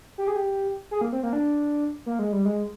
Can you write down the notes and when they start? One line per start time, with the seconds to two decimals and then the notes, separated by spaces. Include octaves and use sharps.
0.18 G4
0.28 G#4
0.36 G4
0.91 G#4
1.01 A#3
1.12 C4
1.23 A#3
1.33 D4
2.06 A#3
2.19 G#3
2.33 G3
2.45 G#3